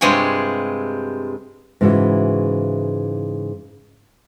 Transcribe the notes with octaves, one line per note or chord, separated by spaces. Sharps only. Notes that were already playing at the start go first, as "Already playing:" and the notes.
G2 C3 G#3 F4 C#5 G#5
G#2 C#3 E3 E4 F#4